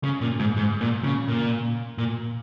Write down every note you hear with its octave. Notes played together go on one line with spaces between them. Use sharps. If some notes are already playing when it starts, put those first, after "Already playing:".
C#3
A#2
G#2
G#2
A#2
C#3
A#2
A#2